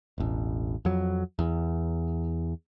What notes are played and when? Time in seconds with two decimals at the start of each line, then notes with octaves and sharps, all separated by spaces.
0.18 E1 A1
0.85 F2 F#3
1.39 E2